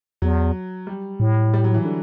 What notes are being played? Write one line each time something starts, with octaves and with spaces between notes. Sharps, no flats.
E2 F#3
G3
A2
G3
F#3
E3
D3